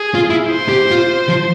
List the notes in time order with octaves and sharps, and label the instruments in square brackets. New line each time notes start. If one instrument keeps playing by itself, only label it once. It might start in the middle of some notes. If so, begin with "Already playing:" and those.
Already playing: [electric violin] G#4
[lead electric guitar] F4
E4
[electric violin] C5
[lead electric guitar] G4
F4
F3